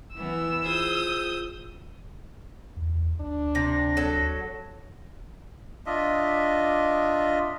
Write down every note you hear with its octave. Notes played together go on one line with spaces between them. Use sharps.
E3 B3 E6
F4 G#4 C5 D#6 G6
E2
D2 D4
C3 A#6
F#3 A4
D4 F4 D#5 E5